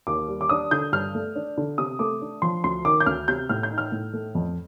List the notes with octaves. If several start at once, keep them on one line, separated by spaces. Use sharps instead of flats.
D#2 D6
G3
D6
D4 D#6
D3 G6
G2 F6
A3
D4
D3
C3 D#6
A3 D6
D4
F3 C6
D2 C6
D#3 D6
G6
D2 F6
C3 G6
A2 F6
G6
D#4
F6
A2
A3
F2